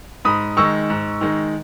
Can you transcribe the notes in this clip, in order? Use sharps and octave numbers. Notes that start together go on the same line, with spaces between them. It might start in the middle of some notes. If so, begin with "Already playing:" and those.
G#2 B5 D#6
D#3 G#3 D#4 C#6 E6
G#2
D#3 G#3 D#4